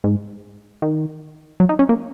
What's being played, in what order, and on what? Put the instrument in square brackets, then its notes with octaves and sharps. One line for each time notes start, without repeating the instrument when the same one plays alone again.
[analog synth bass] G#2
D#3
F#3
D#4
C#4
A#3